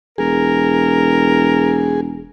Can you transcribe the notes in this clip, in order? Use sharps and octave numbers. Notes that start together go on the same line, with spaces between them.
E1 G#4 A#4